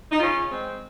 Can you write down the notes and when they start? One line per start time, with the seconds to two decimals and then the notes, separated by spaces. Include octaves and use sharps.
0.12 D#4
0.19 C#3 C#4 F4
0.48 G#3 C4